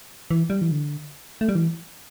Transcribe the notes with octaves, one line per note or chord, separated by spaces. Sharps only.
E3
G3
E3
D3
A3
G3
E3